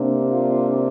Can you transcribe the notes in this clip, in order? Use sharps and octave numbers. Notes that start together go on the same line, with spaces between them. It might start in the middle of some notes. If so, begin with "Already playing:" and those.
Already playing: C3 A#3 D4
F4